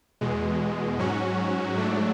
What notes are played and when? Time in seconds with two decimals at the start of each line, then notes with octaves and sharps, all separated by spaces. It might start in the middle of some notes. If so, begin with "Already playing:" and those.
0.21 E2 B2 G#3
0.98 G#2 F#3 C#4 F#4
1.75 G#2 F#3 A3 D4